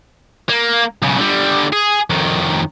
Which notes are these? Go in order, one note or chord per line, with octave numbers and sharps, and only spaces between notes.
A#3
B1 C#3
D3 G3
G#4
F2 D#3